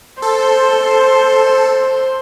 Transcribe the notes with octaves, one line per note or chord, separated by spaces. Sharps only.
A4 C5